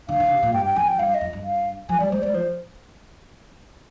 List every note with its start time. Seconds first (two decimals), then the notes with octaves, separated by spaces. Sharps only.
0.09 D3 F5
0.20 D3
0.31 C3
0.43 A#2
0.53 G2 G5
0.65 G5
0.76 F2 G#5
0.88 G5
0.99 G2 F5
1.14 D#5
1.21 F2
1.33 G2
1.44 F5
1.89 F3 G#5
2.00 G3 D5
2.12 G#3 C5
2.22 G#3 D5
2.34 F3 C5